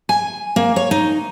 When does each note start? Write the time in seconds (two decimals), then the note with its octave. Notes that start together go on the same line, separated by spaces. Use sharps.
0.09 G#5
0.56 A#3
0.76 C#5
0.91 D#4